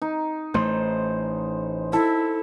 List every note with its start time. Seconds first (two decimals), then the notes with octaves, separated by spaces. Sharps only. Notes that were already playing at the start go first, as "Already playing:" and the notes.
0.02 D#4
0.54 A1 A3 C5
1.93 E4 A4